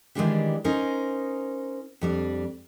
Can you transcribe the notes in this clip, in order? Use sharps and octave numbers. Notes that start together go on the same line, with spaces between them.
D#3 E3 G3 G#3 D4 G4
C#4 D#4 A#4 C5
F2 G3 D4